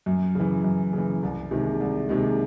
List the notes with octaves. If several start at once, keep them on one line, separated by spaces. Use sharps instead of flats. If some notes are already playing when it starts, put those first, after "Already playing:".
F#2
C#3 E3
F#2
C#3
E3
C2
C3 D#3 G#3
C2
C3 D#3 G#3